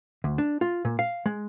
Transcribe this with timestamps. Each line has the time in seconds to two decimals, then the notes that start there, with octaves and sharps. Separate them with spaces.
0.24 D2
0.38 D4
0.61 F4
0.85 A#2
0.99 F5
1.26 G#3